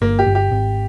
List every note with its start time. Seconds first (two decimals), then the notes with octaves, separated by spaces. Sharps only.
0.01 G1 A#3
0.19 G4
0.27 G1
0.35 G4
0.52 G#1